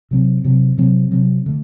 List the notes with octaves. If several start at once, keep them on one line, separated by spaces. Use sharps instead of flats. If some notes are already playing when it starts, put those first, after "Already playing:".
C3 F#3 C4
C3 F#3 C4
C3 F#3 C4
C3 F#3 C4
D3 A3